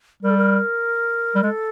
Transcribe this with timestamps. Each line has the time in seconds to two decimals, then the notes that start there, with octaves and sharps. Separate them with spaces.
0.23 G3 A#4
0.30 A4
0.37 A#4
1.35 G3
1.43 G#3 A4